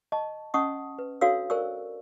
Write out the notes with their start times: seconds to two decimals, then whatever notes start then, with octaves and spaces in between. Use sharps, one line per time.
0.12 D#5 A5 C#6
0.54 C#4 D#5 F#5 A5 C#6 D#6
0.99 B4
1.21 D4 F#4 A4 C#5 F5 E6
1.50 A#4 C5 D5 G#5 C#6 E6